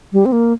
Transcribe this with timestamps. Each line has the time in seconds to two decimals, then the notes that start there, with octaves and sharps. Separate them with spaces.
0.13 G3
0.26 C4
0.32 A#3